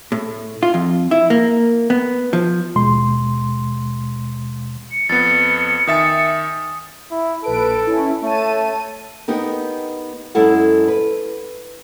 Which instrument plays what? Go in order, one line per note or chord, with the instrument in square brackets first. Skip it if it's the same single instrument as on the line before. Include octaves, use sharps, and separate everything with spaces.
[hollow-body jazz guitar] A2
F4
F2
E4
A#3
B3
F3
[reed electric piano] D#2 B2 G#3 C6
[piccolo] C#7
[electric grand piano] F2 B3 [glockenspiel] A6 [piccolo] C#7
[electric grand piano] D#3 E5 A6 [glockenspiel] G#5 D#6
[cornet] E4
[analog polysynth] A#1 B4 D7 [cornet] A4
[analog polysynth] C#4 E4
[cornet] A3 [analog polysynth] C#5 A5 D#7
[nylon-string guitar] B3 D#4 G4 A#4
F#2 G#3 E4 A4 F#5
B4